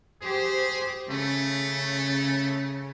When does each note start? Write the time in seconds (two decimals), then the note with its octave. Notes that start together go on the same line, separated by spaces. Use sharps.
0.22 G4 G#4 C5
1.11 C#3 A3